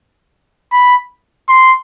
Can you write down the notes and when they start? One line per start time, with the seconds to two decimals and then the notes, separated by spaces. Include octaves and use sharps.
0.72 B5
1.49 C6